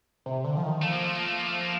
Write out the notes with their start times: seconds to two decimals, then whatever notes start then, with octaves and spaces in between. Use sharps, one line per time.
0.26 C3
0.44 D3
0.57 F3
0.63 D#3
0.81 F3 A3
0.93 A#3
1.04 A3
1.15 A#3
1.26 A3
1.37 A#3
1.49 A3
1.60 A#3